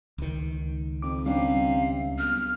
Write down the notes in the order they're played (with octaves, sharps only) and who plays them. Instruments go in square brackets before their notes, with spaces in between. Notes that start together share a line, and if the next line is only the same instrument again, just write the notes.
[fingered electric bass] C#2 D#3
[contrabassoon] F2 [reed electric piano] D6
[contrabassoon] C3 [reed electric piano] G3 C#4 D4 [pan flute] F5
[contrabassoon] B1 [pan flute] F6